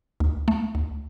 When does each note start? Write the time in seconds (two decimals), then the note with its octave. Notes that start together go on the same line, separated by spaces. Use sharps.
0.20 D2
0.48 A3
0.75 D2